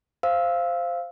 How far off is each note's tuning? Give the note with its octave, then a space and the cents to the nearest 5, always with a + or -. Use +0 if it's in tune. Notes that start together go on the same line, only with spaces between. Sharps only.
C5 +0 F5 -10 E6 -15